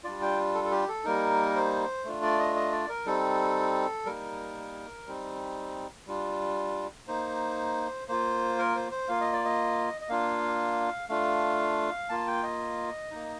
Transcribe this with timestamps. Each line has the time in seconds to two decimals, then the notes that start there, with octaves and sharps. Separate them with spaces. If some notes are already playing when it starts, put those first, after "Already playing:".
0.04 G3 D4 F4 D5
0.22 G5
0.54 A4
0.65 A4
0.71 G4
0.88 A4
1.04 G3 A#3 D#4 A#4
1.56 C5
2.05 A3 D4 F4
2.23 D5
2.39 D#5
2.55 D#5
2.72 D5
2.89 A#4
3.06 G3 C4 D#4 A4
4.06 G3 A#3 D#4 A#4
5.07 G3 C4 D#4
6.07 G3 D4 F4
7.08 A#3 D#4 C5
8.08 A#3 F4 C5
8.59 A#4
8.76 C5
8.91 C5
9.08 A#3 F4 F5
9.21 D#5
9.33 D5
9.45 D#5
10.01 D#5
10.08 A#3 D4 F4 F5
11.09 A3 D4 F4 F5
12.09 A#3 F4 A5
12.27 G5
12.43 D#5
13.11 A#3 D#4